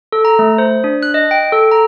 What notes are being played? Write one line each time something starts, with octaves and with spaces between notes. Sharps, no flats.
A4
A#5
A3
C5
D4
F#6
D#5
G5
A4
A#5